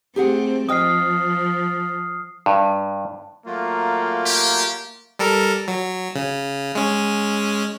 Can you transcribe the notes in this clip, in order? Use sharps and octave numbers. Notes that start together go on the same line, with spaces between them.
A3 C4 G4 G#4 F#5
F3 D#5 G5 D#6 F6 C7
G2
F#3 A3 A#3 F4
G4
G3 A4 A#4
F#3
C#3
G#3 C#4